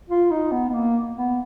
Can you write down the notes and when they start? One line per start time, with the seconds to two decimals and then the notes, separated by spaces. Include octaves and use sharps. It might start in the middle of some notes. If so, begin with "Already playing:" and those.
0.09 F4
0.31 D#4
0.52 B3
0.69 B3
0.74 A#3
1.16 B3